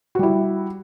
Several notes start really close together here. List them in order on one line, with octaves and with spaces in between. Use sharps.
F#4 G3 E4